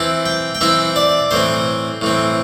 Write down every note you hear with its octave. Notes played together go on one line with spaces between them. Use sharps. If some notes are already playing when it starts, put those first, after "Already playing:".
Already playing: E3 C4 E4 A5
G5
G5
E3 C4 E4 E5
D5
A2 E3 C4 C5
A2 E3 C4